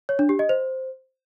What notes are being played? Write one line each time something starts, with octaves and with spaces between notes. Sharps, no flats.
C#5
D4
G4
D#5
C5